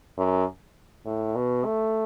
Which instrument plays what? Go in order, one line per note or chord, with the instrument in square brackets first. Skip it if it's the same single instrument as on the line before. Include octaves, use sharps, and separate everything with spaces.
[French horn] F#2
A2
B2
A3